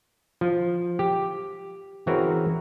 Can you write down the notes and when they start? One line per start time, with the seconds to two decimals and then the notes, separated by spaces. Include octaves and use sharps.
0.41 F3
0.99 G4
2.07 E3 C4 C#4 F#4 G#4 A#4